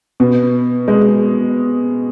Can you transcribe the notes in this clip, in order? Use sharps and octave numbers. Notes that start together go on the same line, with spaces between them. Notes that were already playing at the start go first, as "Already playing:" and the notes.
B2
G#3